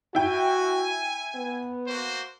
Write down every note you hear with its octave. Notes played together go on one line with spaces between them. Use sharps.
E4 F#4 G5 G#5
B3
A#3 F#4 C5